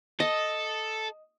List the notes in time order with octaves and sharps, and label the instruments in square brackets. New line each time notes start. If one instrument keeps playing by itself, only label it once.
[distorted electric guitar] A4 [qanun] D#5